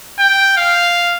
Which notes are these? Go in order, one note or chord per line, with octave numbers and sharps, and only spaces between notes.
G5
F5